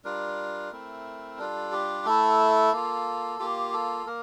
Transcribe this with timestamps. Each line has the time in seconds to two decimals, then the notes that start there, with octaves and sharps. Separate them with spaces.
0.05 G3 D4 F4 A#4
0.72 A3 C4 E4
1.38 G3 D4 F4 A4
1.72 G4
2.06 A3 E4 A4
2.73 A#3 F4
3.39 A#3 F4 G4
3.73 A4
4.07 A#3 A#4